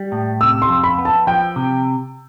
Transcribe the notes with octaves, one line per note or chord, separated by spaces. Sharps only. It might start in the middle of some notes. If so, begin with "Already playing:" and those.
Already playing: G3
A2
C3 E6
C6
F2
B5
B3
A5
F3 G5
C3